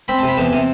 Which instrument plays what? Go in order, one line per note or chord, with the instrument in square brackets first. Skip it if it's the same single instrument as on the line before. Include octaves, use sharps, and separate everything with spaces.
[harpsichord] C4 B5
C3 A5
B5
E2 A5
C3